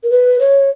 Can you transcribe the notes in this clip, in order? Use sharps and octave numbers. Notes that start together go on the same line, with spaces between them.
A#4
B4
C#5